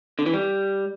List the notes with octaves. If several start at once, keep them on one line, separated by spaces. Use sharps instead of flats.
D3
E3
G3